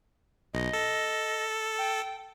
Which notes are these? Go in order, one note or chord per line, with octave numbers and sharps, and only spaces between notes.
B1 D#5
A4
G5